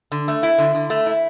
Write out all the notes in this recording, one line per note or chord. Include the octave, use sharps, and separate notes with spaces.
D3
A3
E4
D3
D3
A3
E4